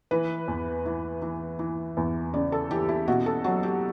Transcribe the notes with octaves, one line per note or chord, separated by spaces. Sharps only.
E3 B4
E2
E3
E3
E3
E2
C#3 D5
A4
E3 G4
E4
B2 F#4
A4
F#3 F#4
G4